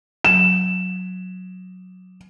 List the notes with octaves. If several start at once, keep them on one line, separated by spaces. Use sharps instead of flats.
F#3 E7